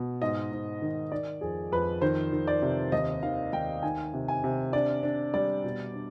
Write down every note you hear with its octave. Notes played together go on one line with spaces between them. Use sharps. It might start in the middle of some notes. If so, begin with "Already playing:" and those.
Already playing: B2
G#2 D#5
G#2
D#3
D#3 D5
F2 G#4
F2 B4
D#3 C5
D#3
D5
C3
D#2 D#5
D#3 F5
D#2 G5
D#3 G#5
C3
G#5
C3
D4 D5
D4
G3 D5
B2
D4